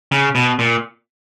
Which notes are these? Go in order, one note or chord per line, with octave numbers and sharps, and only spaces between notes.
C#3
B2
A#2